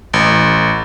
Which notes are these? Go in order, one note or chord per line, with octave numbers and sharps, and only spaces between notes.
A1